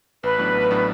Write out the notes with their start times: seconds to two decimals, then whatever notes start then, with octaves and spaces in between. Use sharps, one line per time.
0.23 A1 B4
0.39 A2 F#3 B3 D4
0.55 A1
0.71 A2 F#3 B3 D4